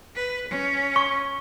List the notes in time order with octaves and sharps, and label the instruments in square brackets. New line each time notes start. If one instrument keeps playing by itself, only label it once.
[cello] B4
C#4
[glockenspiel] C#6